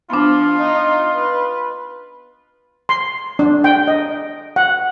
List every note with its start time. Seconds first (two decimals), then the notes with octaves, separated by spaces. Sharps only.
0.10 F3 B3 D4 F4
0.58 D#4
1.14 B4
2.89 C6
3.39 D4
3.64 G5
3.88 D#5
4.56 F#5